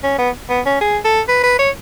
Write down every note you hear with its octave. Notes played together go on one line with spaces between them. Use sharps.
C#4
B3
B3
C#4
G#4
A4
B4
B4
C#5